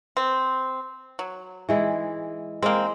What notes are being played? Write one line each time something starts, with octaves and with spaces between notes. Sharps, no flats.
C4
F#3
E3 G#3 E4
G#3 A#3 C4